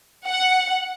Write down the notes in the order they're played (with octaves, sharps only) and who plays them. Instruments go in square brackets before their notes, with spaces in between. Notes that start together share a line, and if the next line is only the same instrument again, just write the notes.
[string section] F#5